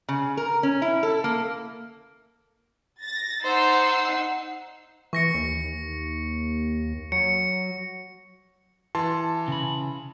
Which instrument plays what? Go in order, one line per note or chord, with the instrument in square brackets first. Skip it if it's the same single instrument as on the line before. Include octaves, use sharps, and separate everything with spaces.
[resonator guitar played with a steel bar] C#3
A#4
C#4
E4
A4
A#3
[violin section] A6 A#6
[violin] D#4 [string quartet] C5 [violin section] F#5 E6 C7
[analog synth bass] E3 [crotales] C#6 A#6 C#7
[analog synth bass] D#2
[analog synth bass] F#3 [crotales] C#7
[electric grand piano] E3 A5 C6
[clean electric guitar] C#3 B5